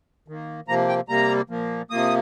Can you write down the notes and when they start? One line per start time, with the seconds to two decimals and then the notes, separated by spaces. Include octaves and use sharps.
0.28 D#3 A#3
0.68 C3 F3 A#3 A#5
0.88 G5
1.09 C3 G3 A#3 A#5
1.50 A#2 F3 A#3
1.90 C3 F3 A#3 D#6